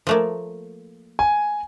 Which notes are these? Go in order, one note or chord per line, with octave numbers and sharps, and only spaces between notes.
F3 A3 A#3
G#5